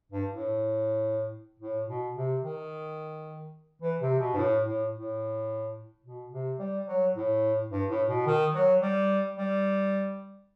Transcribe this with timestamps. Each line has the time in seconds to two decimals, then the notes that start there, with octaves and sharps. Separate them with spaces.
0.12 G2
0.31 A2
1.59 A2
1.88 B2
2.16 C3
2.43 D#3
3.82 E3
4.01 C3
4.19 B2
4.34 G2
4.37 A2
4.65 A2
4.92 A2
6.04 B2
6.32 C3
6.59 G3
6.87 F#3
7.15 A2
7.71 G2
7.89 A2
8.08 B2
8.26 D#3
8.54 F#3
8.81 G3
9.37 G3